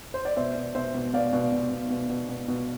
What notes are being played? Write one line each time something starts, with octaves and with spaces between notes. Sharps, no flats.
C5
D5
B2 C5 E5
B2
B2 C5 E5
B2
B2 D5 F5
B2
B2
B2
B2
B2
B2
B2